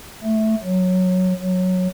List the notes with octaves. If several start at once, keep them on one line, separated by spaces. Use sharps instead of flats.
A3
F#3
F#3